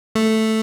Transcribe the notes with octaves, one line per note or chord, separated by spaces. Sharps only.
A3